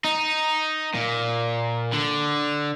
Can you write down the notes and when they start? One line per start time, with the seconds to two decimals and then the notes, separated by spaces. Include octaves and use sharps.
0.04 D#4
0.94 A#2
1.93 D3